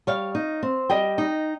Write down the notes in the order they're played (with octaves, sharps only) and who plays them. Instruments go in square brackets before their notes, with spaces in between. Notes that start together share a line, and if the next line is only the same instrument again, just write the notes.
[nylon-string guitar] G3 C#5 F5
D#4
C4
G3 D#5 G5
D#4